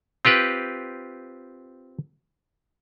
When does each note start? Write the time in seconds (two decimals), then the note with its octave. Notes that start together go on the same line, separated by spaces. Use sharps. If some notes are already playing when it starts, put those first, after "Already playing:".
0.25 C4 F4 G4 B4